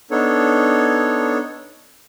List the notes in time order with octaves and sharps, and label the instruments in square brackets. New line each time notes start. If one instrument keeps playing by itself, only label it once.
[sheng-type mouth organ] B3 D4 D#4 A4 C#5